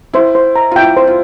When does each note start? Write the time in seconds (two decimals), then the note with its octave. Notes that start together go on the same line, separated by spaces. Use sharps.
0.13 E4 C5
0.35 C5
0.56 A#5
0.71 F4
0.76 E4 G5
0.97 C5
1.07 F4